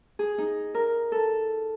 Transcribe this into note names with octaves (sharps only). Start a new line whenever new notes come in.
G#4
D#4
A#4
A4